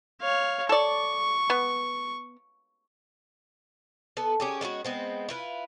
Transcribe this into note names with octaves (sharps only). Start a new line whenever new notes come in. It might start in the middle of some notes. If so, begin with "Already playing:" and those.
C#5 F5
A4 D5 C#6
B3
B3 A4
C#4 G4 G#4
G#3 B3 C#4 F#4
G#3 B3 C4
E4 F4 B4